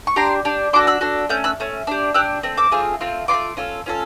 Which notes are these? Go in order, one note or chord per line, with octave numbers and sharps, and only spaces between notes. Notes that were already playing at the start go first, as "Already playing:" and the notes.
C#6
D4 G4 A#5 C6
D4 G4
D4 F#4 A4 C6 D6
E6 F#6
D4 F#4 A4
A3 C#4 G6
E6 F#6
A3 C#4
D4 G4
D4 G4 E6 F#6
A3 C4
D6 E6
A3 C4 F4 G#4
A3 C4 F4
C4 F4 C6 D6
A3
C#4 F4 A4
C#4 F4 A4